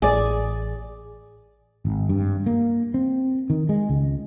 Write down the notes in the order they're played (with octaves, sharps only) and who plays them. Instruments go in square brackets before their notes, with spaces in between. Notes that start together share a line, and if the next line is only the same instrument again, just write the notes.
[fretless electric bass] A1 [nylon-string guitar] G#4 D5
[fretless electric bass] G#1
G2
A#3
C4
D#3
G#3
C#2